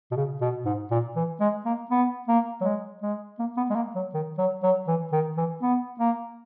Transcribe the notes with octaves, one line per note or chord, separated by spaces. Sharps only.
B2
C#3
B2
G#2
A#2
E3
G#3
A#3
B3
A#3
F#3
G#3
G#3
A#3
B3
G#3
A#3
F#3
D#3
F#3
F#3
E3
D#3
E3
B3
A#3